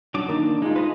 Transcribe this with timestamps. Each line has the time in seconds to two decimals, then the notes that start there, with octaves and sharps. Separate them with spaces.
0.14 F#3 D4 D6
0.28 D#3 A#3 D4
0.62 G#3 D#4 F4
0.76 B4 D#5 G#5